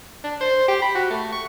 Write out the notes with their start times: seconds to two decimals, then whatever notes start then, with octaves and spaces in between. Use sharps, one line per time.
0.24 D4
0.41 C5
0.68 G4
0.82 B5
0.95 F#4
1.10 A3
1.32 C#6